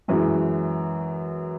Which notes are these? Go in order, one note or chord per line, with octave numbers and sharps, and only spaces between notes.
F#2 E3 G#3